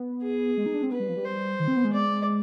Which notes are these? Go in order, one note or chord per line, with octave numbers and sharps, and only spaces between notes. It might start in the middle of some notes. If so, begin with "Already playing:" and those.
Already playing: B3
G#4
G#3
D#4
D4
C4
B3 B4
G3
F3
G3
C5
D#3
C4
B3
G#3
D5